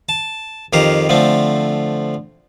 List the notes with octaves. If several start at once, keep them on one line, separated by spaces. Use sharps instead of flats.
A5
F2 D#3 G4 F5 A#5
D3 F3 A3 C4